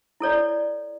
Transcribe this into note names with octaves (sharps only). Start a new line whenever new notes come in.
E4 A4 C#5 D5